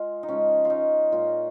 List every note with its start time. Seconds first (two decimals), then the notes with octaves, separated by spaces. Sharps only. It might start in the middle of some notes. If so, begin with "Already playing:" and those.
Already playing: G#3 F4
0.23 D#4
0.29 C#3 F3 G#3 C#4
0.65 F4
0.70 D#4
1.12 A#2 G#3 F4